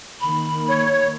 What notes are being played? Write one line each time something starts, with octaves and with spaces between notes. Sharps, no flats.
D#3 A#3 B5
C#5